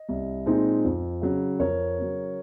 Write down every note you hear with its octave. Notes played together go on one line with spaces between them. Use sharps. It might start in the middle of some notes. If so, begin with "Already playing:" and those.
Already playing: D#5
C2
A#2 G#3 C4 D#4
F2
C#3 F#3
F2 A#4 C#5
C#3 F#3